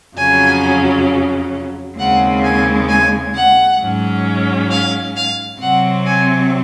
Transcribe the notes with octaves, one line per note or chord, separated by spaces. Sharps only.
F2 C#3 F#3 C#4 G#5
D#2 C#3 G#3 C4 F#5
G#5
G#5
F#5
G#2 F#3 C#4
F5
F5
C3 F#3 C4 F#5
G#5